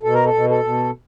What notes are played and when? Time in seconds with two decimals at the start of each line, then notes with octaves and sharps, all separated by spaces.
0.03 B2 A4
0.14 A#4
0.25 A4
0.34 B2
0.49 A4
0.64 B2